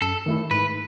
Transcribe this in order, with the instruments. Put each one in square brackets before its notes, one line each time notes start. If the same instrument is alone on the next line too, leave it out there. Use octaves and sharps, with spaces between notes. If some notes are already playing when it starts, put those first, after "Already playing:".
[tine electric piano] F#2 [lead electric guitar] A4
[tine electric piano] D#3 A3 E4
[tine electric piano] G#2 [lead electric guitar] B4